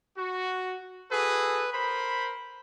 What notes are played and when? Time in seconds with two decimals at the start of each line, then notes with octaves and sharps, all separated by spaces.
0.17 F#4
1.11 F#4 G#4 A4 B4
1.73 A#4 C5 B5